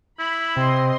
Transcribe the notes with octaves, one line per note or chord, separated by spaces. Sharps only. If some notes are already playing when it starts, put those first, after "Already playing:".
E4 B5
C3 C4 D#5 C6